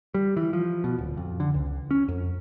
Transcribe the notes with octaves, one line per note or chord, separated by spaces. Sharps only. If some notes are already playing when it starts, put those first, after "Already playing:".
G3
E3
F3
B2
D1
F2
D3
C#2
C#4
F2